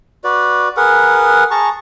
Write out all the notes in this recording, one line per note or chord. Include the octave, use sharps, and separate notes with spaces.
F#4 B4 D5
G#4 A#4 B4 F#5
G#4 A5 A#5 C#6